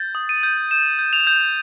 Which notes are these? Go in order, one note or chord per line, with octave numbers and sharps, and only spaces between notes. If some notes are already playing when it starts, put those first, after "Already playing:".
Already playing: G6 A6
D#6
D#7
G6
G6 E7
G6
F7
G6